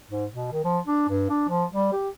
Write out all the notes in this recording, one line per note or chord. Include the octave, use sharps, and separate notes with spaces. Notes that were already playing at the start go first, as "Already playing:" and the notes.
G#2
B2
D#3
F3
D4
G2
D4
F3
G3
G4